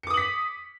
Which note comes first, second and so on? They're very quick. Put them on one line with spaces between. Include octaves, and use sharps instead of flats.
C#7 D6 D#6 F#7 B6